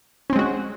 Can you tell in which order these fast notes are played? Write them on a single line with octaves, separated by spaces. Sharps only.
C#4 C4 G#3 F#4